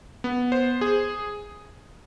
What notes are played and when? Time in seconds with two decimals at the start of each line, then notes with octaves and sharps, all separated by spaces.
0.24 B3
0.52 C5
0.81 G#4